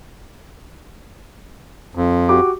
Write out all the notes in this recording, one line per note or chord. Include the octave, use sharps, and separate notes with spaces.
F2
F#4 G4 D6